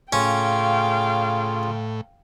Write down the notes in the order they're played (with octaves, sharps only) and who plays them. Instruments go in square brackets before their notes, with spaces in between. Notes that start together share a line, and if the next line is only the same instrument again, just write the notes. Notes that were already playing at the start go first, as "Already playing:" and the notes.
[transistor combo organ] A2 [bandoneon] C#3 F4 [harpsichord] C#4 [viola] F5 G5